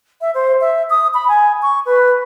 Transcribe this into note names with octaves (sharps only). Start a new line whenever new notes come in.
E5
C5
E5
D#6
B5
G#5
C#6
B4